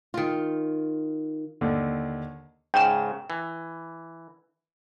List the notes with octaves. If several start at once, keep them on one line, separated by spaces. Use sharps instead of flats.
D#3 F4
D#2 D3
G#2 C#3 G5 E7
E3